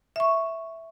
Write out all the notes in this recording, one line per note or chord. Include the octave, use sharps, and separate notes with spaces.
E5 C#6